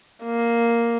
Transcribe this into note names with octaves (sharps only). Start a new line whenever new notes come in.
A#3